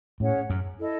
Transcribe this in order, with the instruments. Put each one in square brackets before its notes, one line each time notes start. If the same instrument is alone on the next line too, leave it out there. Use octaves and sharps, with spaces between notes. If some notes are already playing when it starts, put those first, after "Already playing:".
[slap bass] A2 [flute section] C#4 G#4 C#5 F#5
[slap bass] F#2
[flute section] E4 A4 D#5